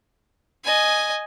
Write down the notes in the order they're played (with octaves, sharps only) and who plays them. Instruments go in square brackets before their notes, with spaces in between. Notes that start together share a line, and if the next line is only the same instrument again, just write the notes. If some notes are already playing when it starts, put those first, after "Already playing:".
[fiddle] D#5 G#5